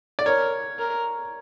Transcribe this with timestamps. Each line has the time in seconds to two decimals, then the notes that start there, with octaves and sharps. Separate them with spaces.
0.19 D5
0.26 A#4 C#5
0.79 A#4